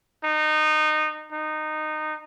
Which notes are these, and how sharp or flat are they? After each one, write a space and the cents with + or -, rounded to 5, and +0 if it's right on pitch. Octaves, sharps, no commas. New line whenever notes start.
D#4 -20
D#4 -15